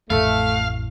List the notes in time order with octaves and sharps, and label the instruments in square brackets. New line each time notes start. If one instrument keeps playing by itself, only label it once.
[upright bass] A1 F2 [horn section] A3 [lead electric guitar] F5